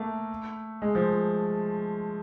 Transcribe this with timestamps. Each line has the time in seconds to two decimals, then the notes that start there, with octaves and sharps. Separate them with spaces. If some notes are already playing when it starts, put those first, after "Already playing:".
Already playing: A3 A#3
0.82 G#3
0.95 F3